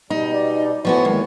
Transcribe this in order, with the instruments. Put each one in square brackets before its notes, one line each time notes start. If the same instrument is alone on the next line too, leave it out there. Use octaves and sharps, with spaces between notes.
[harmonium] B2 G3 [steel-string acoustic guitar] D#4
[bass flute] D5
[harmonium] A2 E3 C#5 [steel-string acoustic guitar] F3 B3 F#4
[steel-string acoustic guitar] D#2 [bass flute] G#3